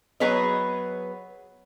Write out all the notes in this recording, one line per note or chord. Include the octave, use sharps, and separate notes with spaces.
F#3 B3 G#4 B4 C#5 D#5